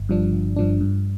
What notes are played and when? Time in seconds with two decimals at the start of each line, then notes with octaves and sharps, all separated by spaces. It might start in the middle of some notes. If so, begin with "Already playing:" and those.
Already playing: G1
0.09 G2 F3 D4
0.33 G1
0.56 G2 F3 D4
0.81 G2